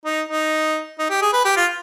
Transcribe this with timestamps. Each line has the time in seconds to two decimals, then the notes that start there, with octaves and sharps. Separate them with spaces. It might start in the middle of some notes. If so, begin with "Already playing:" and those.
0.05 D#4
0.29 D#4
0.99 D#4
1.10 G4
1.22 G#4
1.33 B4
1.45 G4
1.57 F4